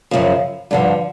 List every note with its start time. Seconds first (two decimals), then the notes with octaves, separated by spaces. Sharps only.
0.11 F#2 C#3 F3
0.71 G2 D3 F3